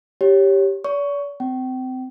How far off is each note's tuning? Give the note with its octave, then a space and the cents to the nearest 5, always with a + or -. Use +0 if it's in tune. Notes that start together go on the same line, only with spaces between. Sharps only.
G4 +0 C#5 +0
D5 -45 C#6 +15
C4 -25 G5 -35